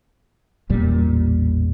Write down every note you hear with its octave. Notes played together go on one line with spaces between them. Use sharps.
A1 E2 A#2 G3